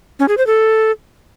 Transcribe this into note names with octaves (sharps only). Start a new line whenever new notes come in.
C#4
G#4
C5
A4